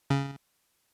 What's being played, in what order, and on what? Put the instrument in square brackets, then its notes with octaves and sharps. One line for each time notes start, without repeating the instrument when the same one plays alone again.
[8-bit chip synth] C#3